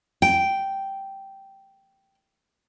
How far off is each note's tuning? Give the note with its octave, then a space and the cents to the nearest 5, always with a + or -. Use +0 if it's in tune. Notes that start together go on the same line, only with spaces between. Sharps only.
G5 -5